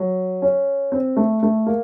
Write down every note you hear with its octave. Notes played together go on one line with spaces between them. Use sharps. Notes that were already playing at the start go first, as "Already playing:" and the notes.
Already playing: F#3
C#4
C4
A3
A3
A#3